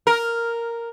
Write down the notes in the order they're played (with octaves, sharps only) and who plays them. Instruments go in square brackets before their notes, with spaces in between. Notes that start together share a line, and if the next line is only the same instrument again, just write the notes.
[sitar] A#4